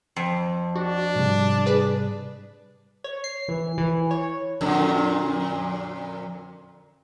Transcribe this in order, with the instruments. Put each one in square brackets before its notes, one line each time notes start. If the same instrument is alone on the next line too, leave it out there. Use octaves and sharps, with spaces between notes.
[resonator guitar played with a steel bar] F2
[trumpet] D4 [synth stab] F#4
[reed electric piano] G#2 C3 G3
[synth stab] G#4 B4 D5
[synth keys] C#5
C7
E3
E3
C#5
[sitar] F2 A#2 D3